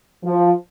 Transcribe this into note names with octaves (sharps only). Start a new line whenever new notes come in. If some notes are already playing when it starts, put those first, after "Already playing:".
F3